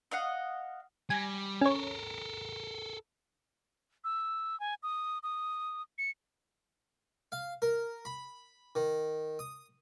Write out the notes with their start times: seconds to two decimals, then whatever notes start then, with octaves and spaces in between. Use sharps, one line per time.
0.11 D#5 F5 F#5
1.10 G3 G#5 A#6
1.61 C#4 A4 A#4 C#5
4.04 E6
4.60 G#5
4.83 D#6
5.23 D#6
5.98 C#7
7.32 F5
7.62 A#4
8.05 B5
8.75 D#3
9.39 D#6